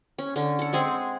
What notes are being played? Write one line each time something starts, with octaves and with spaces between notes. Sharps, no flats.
C#4
D3 C#4
A4 F#5
G#3 C4 G#4 F#5